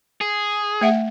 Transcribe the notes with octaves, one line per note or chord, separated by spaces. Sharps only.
G#4
A3 E5 F#5